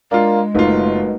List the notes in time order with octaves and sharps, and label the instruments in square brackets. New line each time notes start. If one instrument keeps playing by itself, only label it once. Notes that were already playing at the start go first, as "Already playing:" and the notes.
[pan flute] G#3 [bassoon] A#3 [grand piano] D4 F4
[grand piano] F#1 F4 [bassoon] B2 [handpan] A3 D#4 A#4